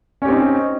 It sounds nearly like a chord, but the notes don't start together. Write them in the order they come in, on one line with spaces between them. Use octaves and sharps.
C#4 G4 C4 D#4